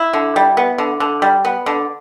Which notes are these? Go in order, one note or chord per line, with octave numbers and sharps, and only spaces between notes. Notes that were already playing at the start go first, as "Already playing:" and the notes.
Already playing: E4
D3
G3
B3
D3
D3
G3
B3
D3